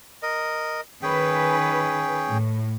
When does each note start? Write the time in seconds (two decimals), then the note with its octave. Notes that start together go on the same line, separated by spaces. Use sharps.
0.23 A#4 D#5
1.03 D#3 C#4 G#4 B4 G5
2.29 A2